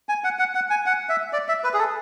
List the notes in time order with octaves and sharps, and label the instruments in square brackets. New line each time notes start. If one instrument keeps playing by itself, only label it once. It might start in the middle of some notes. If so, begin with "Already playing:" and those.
[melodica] G#5
F#5
F#5
F#5
G#5
F#5
E5
D5
E5
B4
G#4
A4